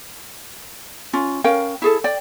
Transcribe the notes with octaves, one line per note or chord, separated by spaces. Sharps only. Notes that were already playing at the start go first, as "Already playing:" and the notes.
C#4 F4
C#4 A#4 F5 G5
E4 G#4 A4
D5 G5